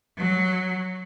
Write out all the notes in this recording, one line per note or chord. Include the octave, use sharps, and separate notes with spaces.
F#3